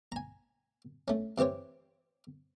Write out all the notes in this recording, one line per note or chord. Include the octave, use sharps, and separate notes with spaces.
G#5 A#5
A3 C#4
C3 E3 G4 C5 C#5